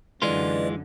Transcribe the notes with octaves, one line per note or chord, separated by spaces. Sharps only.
F#2 D3 E3 G#3 F4 B4 D5 D#5